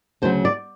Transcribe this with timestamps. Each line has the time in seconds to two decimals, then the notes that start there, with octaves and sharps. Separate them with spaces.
0.22 D2 C#3 F#3 C5
0.45 D5